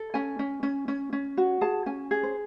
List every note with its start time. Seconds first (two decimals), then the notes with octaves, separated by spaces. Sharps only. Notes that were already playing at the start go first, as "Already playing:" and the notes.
Already playing: A4
0.14 C#4 G#5
0.39 C#4
0.63 C#4
0.88 C#4
1.13 C#4
1.37 F#4
1.61 G#4 A5
1.86 C#4 G#5
2.11 G#4
2.23 C5